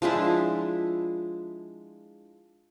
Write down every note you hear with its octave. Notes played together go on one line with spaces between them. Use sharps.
F3 G#3 D4 E4